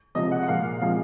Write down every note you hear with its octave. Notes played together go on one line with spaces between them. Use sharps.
C3 F3 G#3 D#5
F#5
F#5
A#2 F3 G#3 F5
C3 F3 G#3 F5